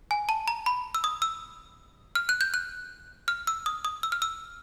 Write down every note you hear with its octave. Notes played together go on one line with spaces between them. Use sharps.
G#5
A5
A#5
B5
E6
D#6
E6
F6
F#6
G6
F#6
F6
E6
D#6
D#6
E6
F6
E6